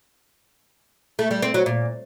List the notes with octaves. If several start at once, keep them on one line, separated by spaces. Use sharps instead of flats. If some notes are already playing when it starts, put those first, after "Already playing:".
A3
G3
C4
F#3
A#2